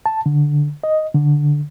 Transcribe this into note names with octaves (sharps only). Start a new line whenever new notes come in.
A5
D3
D#5
D3